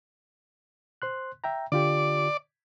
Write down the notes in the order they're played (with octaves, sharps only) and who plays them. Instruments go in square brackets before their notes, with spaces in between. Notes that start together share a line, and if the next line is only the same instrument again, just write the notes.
[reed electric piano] C5 C6 F#6
E5 G5 A#5
[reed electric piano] D3 F4 G4 [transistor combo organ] D5